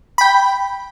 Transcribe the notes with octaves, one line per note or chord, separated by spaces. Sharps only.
G5 B5